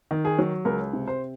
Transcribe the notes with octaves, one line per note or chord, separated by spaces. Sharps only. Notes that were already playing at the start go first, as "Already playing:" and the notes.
D#3
G#4
F#3
C#2 A#4
C3
C5